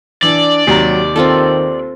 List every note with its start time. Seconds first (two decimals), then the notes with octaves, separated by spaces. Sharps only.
0.23 E3 D4 D5
0.67 D#2 C3 F#3 A#5
1.16 D#3 C4 F4 A4